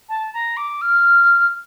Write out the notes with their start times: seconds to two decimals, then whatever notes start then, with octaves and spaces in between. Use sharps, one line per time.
0.09 A5
0.33 A#5
0.57 D6
0.82 F6